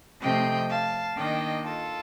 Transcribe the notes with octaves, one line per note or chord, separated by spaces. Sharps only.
C3 F3 A3 D#5 G5
F5 A5
D#3 A#3 D4 D#5 G5
F4 A4